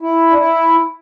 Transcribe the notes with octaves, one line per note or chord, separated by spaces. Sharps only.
E4
D4
E4